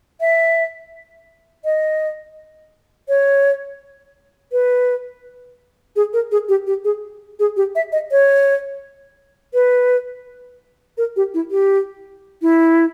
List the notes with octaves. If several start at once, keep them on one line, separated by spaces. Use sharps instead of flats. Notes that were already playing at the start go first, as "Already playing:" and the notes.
E5
D#5
C#5
B4
G#4
A#4
G#4
G4
G4
G#4
G#4
G4
E5
D#5
C#5
B4
A#4
G4
E4
G4
E4